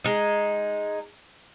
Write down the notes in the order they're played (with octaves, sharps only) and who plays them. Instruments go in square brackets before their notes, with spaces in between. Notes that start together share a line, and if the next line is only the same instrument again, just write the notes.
[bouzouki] G#3 D#4